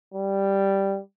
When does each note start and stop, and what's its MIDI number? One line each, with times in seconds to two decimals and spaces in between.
0.14 0.99 55